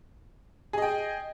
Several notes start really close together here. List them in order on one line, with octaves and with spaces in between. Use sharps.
G#4 D#5 G5